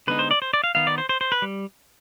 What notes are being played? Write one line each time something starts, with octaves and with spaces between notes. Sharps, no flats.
D3 G#3 B3 D#4 B4
C5
D5
C5
D5
F5
D#3 B3 D#4 F5
D5
C5
C5
C5
B4
G3